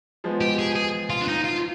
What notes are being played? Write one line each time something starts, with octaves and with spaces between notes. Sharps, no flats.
F3 G#3 B3
G4
G#4
G#4
F4
D4
D#4
F4